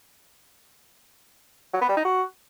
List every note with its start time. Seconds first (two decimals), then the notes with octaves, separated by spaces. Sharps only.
1.73 F#3
1.81 B3
1.89 G3
1.97 D#4
2.05 F#4